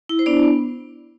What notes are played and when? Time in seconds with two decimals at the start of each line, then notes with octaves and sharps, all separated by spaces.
0.09 E4
0.19 C5
0.26 B3 D4 D5
0.43 B3